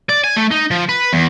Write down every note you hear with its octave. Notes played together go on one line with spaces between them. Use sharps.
D5
G#5
A3
D#4
F3
B4
E2